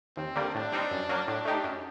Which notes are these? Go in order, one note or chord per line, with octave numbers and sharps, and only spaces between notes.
D#2 C4
D3 G3 A#3
A2 D4
G3 C4 D#4
F#2
F#3 A#3
A2 D4
A3 D#4 G4
F#2